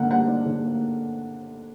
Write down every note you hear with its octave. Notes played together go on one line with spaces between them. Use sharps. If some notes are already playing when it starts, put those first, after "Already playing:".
Already playing: D3 A#3 F#5
G3 F#5
D4
D3
A#3